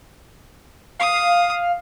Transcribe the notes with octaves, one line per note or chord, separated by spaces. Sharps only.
F5 D#6